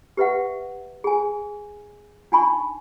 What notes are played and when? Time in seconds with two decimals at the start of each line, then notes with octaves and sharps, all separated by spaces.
0.17 G4 B4 E5 F#5
1.04 G#4 G#5
2.32 D4 D#4 G#5 B5 C#6